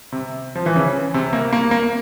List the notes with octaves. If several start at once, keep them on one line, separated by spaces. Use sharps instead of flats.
C3
F3
E3
C#3
C3
A#3
A#3
A#3